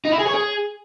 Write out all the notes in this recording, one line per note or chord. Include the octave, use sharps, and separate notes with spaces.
D#4
E4
G#4
C#5
G#4